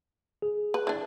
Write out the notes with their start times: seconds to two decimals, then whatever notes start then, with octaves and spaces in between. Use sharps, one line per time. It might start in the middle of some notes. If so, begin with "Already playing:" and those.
0.42 G#4
0.74 B4
0.87 E3 D4